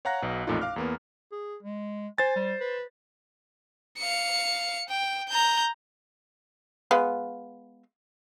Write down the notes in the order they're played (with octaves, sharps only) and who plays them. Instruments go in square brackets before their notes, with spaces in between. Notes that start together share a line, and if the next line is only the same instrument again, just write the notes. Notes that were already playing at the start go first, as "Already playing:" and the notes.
[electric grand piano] C#5 F5 F#5 A#5 F#6 A#6
B1 B2
A1 F2 A#2 A3 D#4 F4
F5 D6 F6
E2 A#3 B3
[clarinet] G#4
G#3
[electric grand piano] C5 A6 [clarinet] G#5
[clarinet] G3
B4
[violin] F5 C#7
G5
A#5 G6
[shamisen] G#3 B3 F4